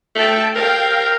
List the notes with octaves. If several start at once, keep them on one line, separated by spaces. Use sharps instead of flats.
A3 G5 A5
A#4 F5 G5